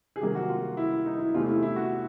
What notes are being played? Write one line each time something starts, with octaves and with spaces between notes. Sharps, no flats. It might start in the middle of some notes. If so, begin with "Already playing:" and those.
G#4
C3 D#3 F#3 A#3 G4
F#4
F4
E4
D#4
E4
E2 C3 E3 A3 F4
E4
E4
F#4